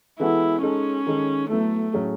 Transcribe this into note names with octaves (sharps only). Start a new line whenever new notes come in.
E3 G#3 B3 E4 F#4 A4
G#3 C#4 D#4 A4
D#3 G#3 D#4 A4
F#3 A3 B3 E4 A4
A2 F#3 C#4 G#4